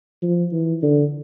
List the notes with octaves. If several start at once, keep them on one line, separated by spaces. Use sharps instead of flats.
F3
E3
D3